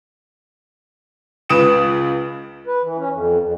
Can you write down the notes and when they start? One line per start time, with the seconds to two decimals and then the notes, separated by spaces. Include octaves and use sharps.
1.49 C#2 B4 D#6 D7 E7
2.67 B4
2.83 E3
2.98 C#4
3.12 F2
3.40 F2